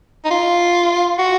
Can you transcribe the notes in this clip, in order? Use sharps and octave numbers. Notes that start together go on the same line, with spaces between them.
D#4
F4
F#4